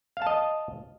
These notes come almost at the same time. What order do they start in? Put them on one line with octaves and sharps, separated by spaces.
F5 A5 D#5